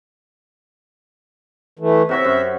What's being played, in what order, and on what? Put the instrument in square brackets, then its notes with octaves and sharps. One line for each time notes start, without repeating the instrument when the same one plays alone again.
[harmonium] E3 A3
[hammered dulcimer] C3 F#4 C#5 [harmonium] E5
[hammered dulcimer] F#2